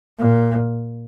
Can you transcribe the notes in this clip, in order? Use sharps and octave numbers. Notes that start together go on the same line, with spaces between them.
A#2